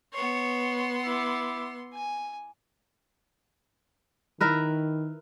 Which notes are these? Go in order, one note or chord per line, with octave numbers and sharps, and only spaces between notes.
B3 C#5 C6
E4 D6
G#5
D#3 E4 A#4 B4